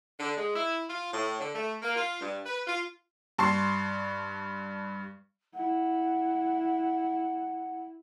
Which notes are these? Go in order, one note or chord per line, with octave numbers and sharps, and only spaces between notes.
D3
G#3
E4
F4
A2
D3
A3
A#3
F4
G2
B4
F4
G2 A5 C6 C#6 C7
E4 F#5